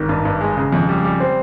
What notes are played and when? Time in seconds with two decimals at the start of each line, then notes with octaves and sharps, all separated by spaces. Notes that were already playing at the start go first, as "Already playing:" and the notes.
Already playing: G#1 D#3
0.09 G2
0.25 G2
0.41 G#3
0.57 C#3
0.73 F2
0.89 G3
1.04 G3
1.20 C4